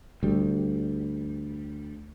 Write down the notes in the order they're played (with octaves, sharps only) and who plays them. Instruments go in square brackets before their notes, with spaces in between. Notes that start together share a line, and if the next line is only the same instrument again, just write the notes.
[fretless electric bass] D2 G3